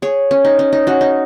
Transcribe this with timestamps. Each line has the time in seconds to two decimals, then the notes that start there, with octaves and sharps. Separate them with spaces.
0.02 G#4 C#5
0.31 C#4
0.45 D#4
0.59 C#4
0.73 D#4
0.87 C#4 F#4
1.01 D#4